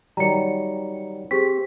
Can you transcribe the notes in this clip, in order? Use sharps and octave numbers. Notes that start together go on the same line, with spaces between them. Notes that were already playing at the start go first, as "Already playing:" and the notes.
D#3 F#3 G3 A#5 C#7
C4 G4 G#4 B6